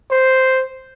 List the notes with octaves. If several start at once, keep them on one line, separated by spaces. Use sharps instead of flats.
C5